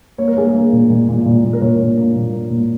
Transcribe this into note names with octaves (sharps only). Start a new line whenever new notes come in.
A#3 C#5
A#4
A#3 G#4
A#4
A#3
A#2
A#2
A#2
A#2
A#2
A#4
A#2 C#5
A#2
A#3
A#2
A#3
A#2